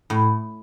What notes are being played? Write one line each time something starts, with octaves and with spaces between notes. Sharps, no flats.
A2